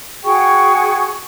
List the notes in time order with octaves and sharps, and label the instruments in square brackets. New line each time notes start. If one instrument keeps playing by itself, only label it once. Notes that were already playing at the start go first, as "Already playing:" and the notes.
[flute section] F#4 G#4 G5 C#6